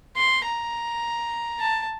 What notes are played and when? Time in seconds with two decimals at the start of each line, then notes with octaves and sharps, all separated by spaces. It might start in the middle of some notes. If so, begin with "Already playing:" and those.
0.17 C6
0.46 A#5
1.60 A5